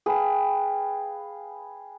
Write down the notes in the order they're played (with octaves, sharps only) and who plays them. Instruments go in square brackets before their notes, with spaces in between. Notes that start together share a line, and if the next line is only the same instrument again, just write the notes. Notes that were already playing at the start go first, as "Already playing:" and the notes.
[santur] G#4 B4 F5 G5